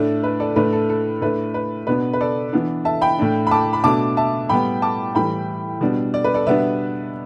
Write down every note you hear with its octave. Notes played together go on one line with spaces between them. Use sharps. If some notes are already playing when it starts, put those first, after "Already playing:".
Already playing: A2 A3 D4
B4
A4 D5
A2 A3 D4 B4
A4
A4
A2 A3 D4 B4
B4
B2 B3 D4 B4
B4
A4 D5
E3 B3 D4
E5 A5
G5 B5
A2 A3 D4
B5
A5 D6
B5
B2 A3 D4 A5 D6
E5 A5
A2 G3 B3 G5 B5
A5 D6
A2 E3 G3 G5 B5
B2 G3 B3 D4
D5
B4
A4 D5
B2 G3 B3 D4 B4 E5